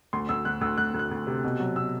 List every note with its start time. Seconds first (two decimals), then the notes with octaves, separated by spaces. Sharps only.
0.13 D2 C6
0.29 D2 E6
0.45 D2 F#6
0.61 D2 E6
0.78 D2 F#6
0.94 D2
0.99 F#6
1.11 D2
1.27 C3
1.44 B2
1.60 F#3
1.76 B2 E6